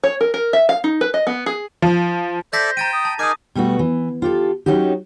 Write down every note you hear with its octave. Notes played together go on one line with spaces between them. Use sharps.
C#5
A#4
A#4
E5
F5
D#4
B4
D#5
B3
G#4
F3
A4 C5 D5 E5 G6 A#6 B6
G5 A#5 A6 D#7
D#6
A5
D#4 G#4 A#4 G#5 D6 D#6
B2 G3 A3 B3 F#4
E3
F4 G4 A4
F#3 C#4 D#4 F#4 G4